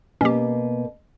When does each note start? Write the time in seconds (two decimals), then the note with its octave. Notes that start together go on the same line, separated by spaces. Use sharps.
0.21 B2 A#3 C#4 G4